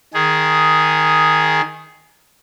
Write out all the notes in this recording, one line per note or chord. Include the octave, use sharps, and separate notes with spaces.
D#3 G#4